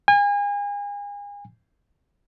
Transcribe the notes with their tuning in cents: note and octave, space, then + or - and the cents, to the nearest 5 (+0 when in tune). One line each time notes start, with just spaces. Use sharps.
G#5 -35